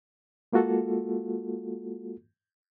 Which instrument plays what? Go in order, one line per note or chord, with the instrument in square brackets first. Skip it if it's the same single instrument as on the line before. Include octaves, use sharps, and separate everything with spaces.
[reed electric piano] G#3 A#3 F4 F#4 A4